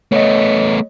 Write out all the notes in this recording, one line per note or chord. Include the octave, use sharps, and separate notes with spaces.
A3 B3 C#5 D#5